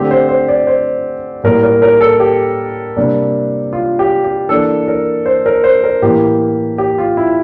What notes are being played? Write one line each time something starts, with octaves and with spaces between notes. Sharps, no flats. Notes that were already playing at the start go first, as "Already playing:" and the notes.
Already playing: D3 A3 C4 G4
C5
C5
D5
C5
A2 G3 A#3 A#4
A#4
A#4
A4
G4
C3 G3 A#3 D4
F4
G4
G4
E3 A#3 D4 A4
A#4
C5
A#4
C5
A#4
A2 E3 A#3 G4
G4
F4
E4